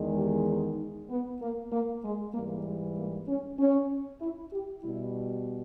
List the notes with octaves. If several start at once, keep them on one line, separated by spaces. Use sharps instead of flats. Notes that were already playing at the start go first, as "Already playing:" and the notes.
Already playing: E2 D#3 G#3
G4
D#4
B3
A#3
A#3
G#3
G#2 E3 G3 A#3
G#3
A#3
C#4
C#4
E4
G4
B2 G3 E4